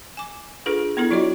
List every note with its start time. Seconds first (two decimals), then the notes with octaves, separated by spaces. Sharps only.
0.17 G#5 D6
0.66 D4 F4 G#4 A4 B4
0.97 B3 D4 E4 A4
1.11 F#3 F4 F#4 C#5 D#5